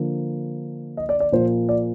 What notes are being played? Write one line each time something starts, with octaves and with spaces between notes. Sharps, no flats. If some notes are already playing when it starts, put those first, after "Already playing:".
Already playing: D3 F3 A#3
D#5
D5
D5
A#2 F3 A#3 C5
D5